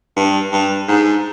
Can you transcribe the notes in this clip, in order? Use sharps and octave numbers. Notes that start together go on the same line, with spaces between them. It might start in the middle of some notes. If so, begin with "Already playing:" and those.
G2
G2
G#2